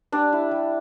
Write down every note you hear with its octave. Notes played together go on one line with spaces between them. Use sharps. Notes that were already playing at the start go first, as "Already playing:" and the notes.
G3 D4 D5
E4
G3